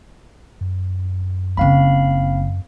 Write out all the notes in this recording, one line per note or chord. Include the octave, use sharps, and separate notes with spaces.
F#2
F#1 C4 D#4 F5 B5